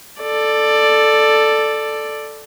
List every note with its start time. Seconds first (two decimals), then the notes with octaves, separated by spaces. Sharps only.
0.21 A4 D5